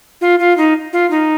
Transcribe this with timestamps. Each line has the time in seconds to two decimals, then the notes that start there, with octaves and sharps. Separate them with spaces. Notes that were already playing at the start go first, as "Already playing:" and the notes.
0.21 F4
0.39 F4
0.57 D#4
0.93 F4
1.11 D#4